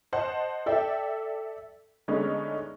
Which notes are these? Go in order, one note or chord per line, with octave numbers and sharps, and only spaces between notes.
C5 D#5 F#5 A5
A4 D5 E5 G5
D3 G#3 A3 B3 C#4 D#4